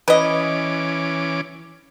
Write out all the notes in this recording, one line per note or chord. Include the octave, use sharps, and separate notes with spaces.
E3 C#4 B4 D#5 D6